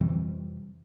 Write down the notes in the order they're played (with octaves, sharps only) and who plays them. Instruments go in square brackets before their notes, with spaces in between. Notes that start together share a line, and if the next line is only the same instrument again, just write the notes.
[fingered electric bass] F2 C3 E3 G3